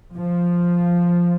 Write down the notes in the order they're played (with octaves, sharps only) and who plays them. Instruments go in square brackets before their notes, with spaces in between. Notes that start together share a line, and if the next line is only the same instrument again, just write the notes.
[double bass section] F3